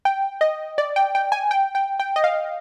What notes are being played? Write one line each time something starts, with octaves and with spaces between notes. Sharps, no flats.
G5
D#5
D5
G5
G5
G#5
G5
G5
G5
D#5
F5